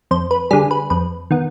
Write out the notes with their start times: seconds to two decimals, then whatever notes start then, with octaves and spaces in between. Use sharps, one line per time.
0.11 F2 C5
0.31 B4
0.51 D3 G3 G#4
0.71 B4
0.90 F2 B4
1.31 D#3 B3